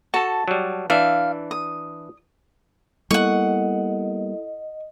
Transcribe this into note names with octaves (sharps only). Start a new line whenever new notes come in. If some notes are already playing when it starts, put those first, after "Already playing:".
F#4 A4 A5
F#3 G3
E3 D4 E5 F5
D#6
G3 A#3 B3 E4 A4 D#5 F#5 C#6